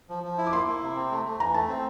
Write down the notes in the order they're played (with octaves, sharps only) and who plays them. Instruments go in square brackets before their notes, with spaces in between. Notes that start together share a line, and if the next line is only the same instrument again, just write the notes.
[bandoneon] F3
F3
E4
[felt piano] D6
[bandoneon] A#3 [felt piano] C6
[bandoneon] E4
C3
C4
A3
A3
[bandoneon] E3 [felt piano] A#5
[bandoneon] A3 [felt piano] A5
[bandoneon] C4